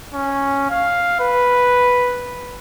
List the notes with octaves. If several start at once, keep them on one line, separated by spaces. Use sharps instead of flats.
C#4
F5
B4